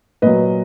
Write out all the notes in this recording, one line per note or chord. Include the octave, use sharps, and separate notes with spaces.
A#2 F#3 B4 D#5